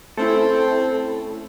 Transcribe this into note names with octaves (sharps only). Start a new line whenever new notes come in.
A3 C4 C#4 E4 A4